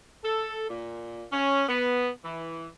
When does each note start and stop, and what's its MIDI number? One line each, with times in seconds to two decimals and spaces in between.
0.24 0.66 69
0.69 1.25 46
1.32 1.65 61
1.69 2.08 59
2.25 2.67 52